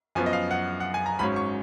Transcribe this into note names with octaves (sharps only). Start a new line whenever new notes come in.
F#2 F3 B3 G#5
D#5
F5
F#5
F#5
G#5
A#5
G#1 G#2 F#3 C#4 B5
C#6